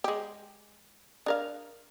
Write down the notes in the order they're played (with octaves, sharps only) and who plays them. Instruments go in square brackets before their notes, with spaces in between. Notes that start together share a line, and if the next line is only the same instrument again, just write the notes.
[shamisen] G#3 G4
D4 A#4 F5